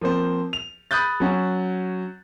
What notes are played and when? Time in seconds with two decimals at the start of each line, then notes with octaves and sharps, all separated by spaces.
0.01 F3 A#3 C4 C5
0.53 F7
0.91 B5 D#6 F#6 G6 A6
1.20 F#3 C#4 F#4